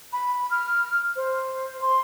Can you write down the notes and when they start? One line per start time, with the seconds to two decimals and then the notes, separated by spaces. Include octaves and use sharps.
0.13 B5
0.51 F6
1.16 C5
1.81 C6